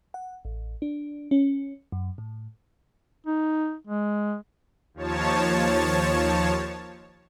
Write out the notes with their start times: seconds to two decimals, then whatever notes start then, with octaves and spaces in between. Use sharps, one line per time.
0.14 F#5
0.45 A1
0.82 D4
1.31 C#4
1.92 F#2
2.18 A2
3.27 D#4
3.87 G#3
4.94 D#2 F3 C#5 A5